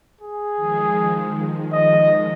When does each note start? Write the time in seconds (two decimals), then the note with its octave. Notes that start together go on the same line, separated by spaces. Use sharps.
0.21 G#4
0.56 D#3 F3 G#3
1.73 D#5